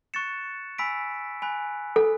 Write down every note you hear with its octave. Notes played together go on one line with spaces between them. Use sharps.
C#6 F#6 A6 C#7 E7
G#5 B5 E6 B6 D7
G#5 B5 F#6
A4